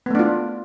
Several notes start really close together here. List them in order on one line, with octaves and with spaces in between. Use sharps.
B3 A3 D4 F4